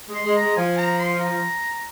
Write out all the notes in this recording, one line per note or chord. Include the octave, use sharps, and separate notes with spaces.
G#3
C6
G#3
A#5
G#3
F3 G#5
A#5
C6
A#5